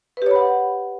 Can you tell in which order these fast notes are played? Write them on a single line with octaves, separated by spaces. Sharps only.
B4 G4 C#5 B5 F#5